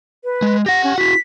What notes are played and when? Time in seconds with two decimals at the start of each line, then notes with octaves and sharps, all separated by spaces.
0.24 B4
0.42 G#3
0.66 G4 F#5 A#6
0.84 C#4
0.98 E4 F#4 B6